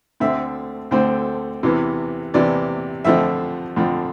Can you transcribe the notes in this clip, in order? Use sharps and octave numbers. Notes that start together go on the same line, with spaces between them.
D2 D3 A3 C4 E5
D2 D3 A3 C4 C5
E2 C3 E3 B3
E2 C3 E3 B3 D5
F2 D3 F3 A3 C4 E5
F2 D3 F3 A3 C4